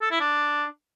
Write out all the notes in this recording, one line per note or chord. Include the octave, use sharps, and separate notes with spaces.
A4
E4
D4